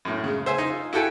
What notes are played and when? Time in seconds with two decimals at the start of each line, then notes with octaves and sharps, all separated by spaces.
0.05 F#2 A2
0.24 C#3 G#3
0.46 C5 E5 G#5
0.58 D#4
0.70 F4
0.93 E4 F#4 G4 A4 G5 G#5